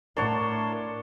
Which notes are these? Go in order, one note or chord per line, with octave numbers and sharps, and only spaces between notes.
A2 D4 A#4 C#5 F#5 A5 C6